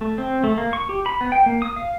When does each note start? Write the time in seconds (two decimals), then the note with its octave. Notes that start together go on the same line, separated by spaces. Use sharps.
0.01 A3
0.18 C4
0.44 A3
0.58 A#3
0.73 C#6
0.89 G4
1.06 B5
1.21 B3
1.32 G5
1.46 A#3
1.62 D#6
1.76 F5